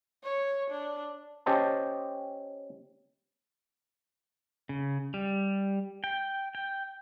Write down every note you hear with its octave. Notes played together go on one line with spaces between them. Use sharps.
C#5
D4
C#4 G4 C5 D#5 A5
C#3
G3
G5
G5